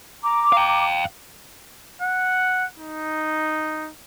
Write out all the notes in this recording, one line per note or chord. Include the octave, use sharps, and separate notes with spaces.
A#5 D6
F5 G5
F#5
D#4